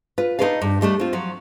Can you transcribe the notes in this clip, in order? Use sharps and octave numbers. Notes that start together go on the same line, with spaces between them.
F4 B4
D#4 F4 A4 B4 D5 F5
G2
D#2 G3 A3 D4
C4 F4
F3 F#3